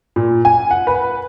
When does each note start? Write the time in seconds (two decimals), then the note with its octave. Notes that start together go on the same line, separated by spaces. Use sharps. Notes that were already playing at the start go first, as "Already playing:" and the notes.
0.16 A#2
0.45 G#5
0.71 F#5
0.87 B4